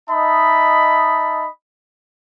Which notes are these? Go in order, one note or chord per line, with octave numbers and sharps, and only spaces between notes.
D#4 D#5 E5 A5 B5